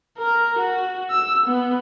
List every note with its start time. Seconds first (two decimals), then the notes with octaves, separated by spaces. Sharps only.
0.18 A#4
0.59 F#4
1.11 E6
1.46 B3